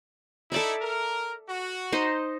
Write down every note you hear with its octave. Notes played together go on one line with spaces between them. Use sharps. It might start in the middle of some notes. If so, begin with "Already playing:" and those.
D#4 E4 A4 D5 E5
A#4
F#4
D#4 C5 D#5